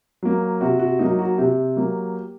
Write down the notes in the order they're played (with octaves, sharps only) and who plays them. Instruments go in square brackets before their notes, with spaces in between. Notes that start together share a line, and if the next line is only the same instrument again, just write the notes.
[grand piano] F#3 A#3
C3 F#4
F#4
F#3 A#3 D#4
F#4
C3 G4
F#3 A#3